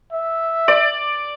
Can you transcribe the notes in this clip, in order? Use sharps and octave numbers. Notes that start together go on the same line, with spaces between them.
E5
D5